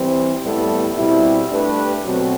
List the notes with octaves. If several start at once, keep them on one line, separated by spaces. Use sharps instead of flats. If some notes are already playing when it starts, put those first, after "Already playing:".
Already playing: E3 G3 C4
A2 G3 B3 E4 A4
B2 G3 C4 E4
A3 D4 G4 B4
B2 F#3 A3 C4